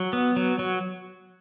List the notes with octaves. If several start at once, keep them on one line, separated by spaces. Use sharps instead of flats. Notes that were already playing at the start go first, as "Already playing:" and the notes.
Already playing: F#3
B3
F#3
F#3